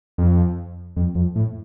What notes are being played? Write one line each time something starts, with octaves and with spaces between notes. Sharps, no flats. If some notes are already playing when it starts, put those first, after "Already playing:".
F2
F2
F2
A2